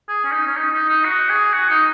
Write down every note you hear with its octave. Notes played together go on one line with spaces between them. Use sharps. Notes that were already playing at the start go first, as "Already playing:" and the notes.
G#4
C#4
D#4
C#4
D#4
D#4
D#4
F#4
G#4
F#4
D#4